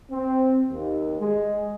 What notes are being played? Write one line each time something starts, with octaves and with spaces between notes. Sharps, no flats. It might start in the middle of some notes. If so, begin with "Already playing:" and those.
C4
D#2
G#3